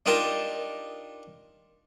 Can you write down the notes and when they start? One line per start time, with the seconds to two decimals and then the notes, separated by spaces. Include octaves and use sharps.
0.06 D4 D#4 F4 G4 A#4 A5